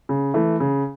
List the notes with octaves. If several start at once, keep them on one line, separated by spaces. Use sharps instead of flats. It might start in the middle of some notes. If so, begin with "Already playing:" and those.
C#3
E3 A3
C#3